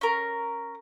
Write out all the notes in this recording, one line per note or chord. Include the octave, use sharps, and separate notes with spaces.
C#4 A#4